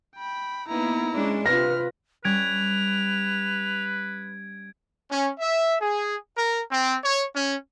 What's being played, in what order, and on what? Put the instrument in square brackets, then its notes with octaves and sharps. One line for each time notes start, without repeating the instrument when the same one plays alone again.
[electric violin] G5 B5
[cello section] A#3 B3 D#4 [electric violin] E4 A#5
[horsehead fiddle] G#3 [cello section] C#4 D4
[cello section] C3 [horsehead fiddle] F4 B4 [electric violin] F6 [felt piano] A#6
[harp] G3 C#4 [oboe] B4 [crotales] G#6 D7 [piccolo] F7
[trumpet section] C#4
E5
G#4
A#4
C4
C#5
C#4